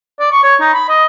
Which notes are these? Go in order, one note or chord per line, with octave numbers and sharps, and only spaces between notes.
D5
C#6
C#5
D#4
B5
D#5